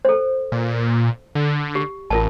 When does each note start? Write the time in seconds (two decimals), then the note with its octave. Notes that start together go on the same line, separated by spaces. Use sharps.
0.05 A4 C5
0.52 A#2
1.35 D3
1.75 G4
2.10 A1 F4 A#4 A5